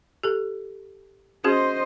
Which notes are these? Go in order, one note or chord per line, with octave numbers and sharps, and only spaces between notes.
G4 A4
C#4 F#4 G#4 C5 D#5